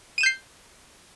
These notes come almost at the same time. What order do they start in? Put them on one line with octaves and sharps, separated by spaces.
D#7 E7 G6 C7